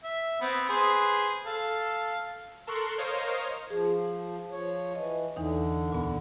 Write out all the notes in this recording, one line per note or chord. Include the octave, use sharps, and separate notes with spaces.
E5
B3 C4
G#4 B4 C5
A4 F5
A4 A#4 C6 C#6 F#6
A#4 C5 C#5 D#5 F5
F3 G#4
F3 C#5
E3 D#5
E2 D3 E3 D#4
D2 A#2 B3